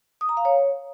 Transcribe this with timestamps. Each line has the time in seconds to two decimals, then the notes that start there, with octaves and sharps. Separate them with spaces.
0.21 D#6
0.29 A#5
0.37 F5
0.45 C#5